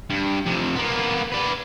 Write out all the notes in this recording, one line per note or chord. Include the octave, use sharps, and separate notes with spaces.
G2
F2 C3
A#3 B3
B4 D5